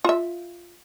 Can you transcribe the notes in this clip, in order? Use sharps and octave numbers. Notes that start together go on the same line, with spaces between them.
F4 E5